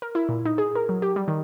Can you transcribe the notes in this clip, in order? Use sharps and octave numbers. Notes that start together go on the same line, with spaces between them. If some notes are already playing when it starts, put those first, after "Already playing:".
A#4
E4
A#2
D#4
G#4
A#4
F#3
G4
G3
D#3